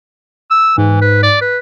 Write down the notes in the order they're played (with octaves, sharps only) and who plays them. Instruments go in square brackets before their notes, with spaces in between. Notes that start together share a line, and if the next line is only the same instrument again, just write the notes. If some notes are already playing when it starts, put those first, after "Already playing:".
[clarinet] E6
[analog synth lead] G#2 [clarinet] E3
[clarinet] B4
D5
B4